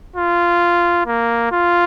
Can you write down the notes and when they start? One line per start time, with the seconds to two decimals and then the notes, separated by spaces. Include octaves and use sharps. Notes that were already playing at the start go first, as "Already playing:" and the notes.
0.16 F4
1.06 A#3
1.52 F4